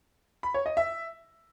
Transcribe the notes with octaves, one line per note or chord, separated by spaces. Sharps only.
B5
C#5
D#5
E5